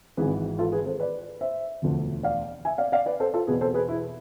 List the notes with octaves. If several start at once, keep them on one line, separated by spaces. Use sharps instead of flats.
G#1 G#2 E3 G#4 B4
F4 A4
G#4 B4
A4 C5
B4 D5
C5 E5
E1 D2 D3 F3
D5 F5
E5 G#5
D5 F5
D5 F5
B4 D5
A4 C5
F4 A4
E2 B2 G#4 B4
A4 C5
G#4 B4
E4